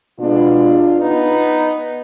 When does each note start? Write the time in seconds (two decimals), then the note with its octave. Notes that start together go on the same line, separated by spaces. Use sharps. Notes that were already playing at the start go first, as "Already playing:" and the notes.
0.19 B2 G#3 B3 D4 F4
0.98 B3 D#4